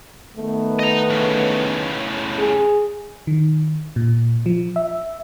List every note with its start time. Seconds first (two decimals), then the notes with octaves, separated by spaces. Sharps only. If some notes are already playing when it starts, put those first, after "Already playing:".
0.37 D#3 A3 B3
0.79 D#5 A#5
1.10 A2 C#3
2.39 G#4
3.27 D#3
3.96 A#2
4.46 F3
4.76 E5